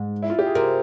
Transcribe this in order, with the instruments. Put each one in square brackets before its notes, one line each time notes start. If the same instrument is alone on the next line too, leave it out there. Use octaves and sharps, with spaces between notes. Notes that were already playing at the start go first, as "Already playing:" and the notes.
Already playing: [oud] G#2
[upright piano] E4
F4
G4
G#4
[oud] C3 [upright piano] A#4